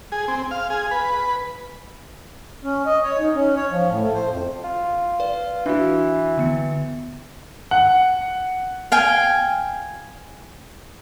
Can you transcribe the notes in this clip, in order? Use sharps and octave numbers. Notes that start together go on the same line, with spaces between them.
G#4
C4
F5
G#4
B4
C#4
D#5
C#5
D#4
C#4
C#5
F3
A2
A3
C5
F2
F4
B4 D5
E3 D4 F#4
D3 B3 C#7
F#5
F5 G5 G#5